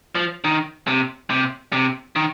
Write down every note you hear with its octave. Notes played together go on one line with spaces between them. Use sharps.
F3
D#3
C3
C3
C3
D#3